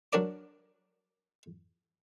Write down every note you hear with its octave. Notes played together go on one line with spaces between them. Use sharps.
F#3 D4 A#4 D5 D6